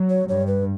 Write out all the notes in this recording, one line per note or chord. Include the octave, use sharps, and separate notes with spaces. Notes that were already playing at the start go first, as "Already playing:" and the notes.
Already playing: F#3
C#5
G2 C#5
B4